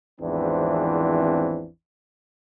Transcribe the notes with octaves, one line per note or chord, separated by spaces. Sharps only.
G#1 E2 E3 F3 C4 D4